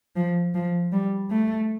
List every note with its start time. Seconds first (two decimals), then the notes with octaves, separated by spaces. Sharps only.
0.16 F3
0.55 F3
0.92 G3
1.30 A3